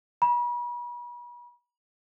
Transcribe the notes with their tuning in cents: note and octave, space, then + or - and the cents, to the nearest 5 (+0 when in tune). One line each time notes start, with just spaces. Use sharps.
B5 -40